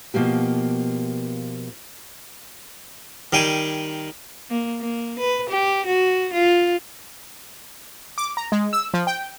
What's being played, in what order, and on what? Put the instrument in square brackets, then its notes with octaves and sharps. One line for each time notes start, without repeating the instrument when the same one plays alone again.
[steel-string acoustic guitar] B2 F3 A#3 G4
[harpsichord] D#3 G3 G5 G#5
[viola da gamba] A#3
A#3
B4
G4
F#4
F4
[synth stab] D6
A#5
G#3
E6
F3
G5